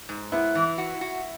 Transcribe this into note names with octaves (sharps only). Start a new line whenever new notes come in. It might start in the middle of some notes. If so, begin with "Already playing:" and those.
G#2
B3 E4
E3
F#4
F#4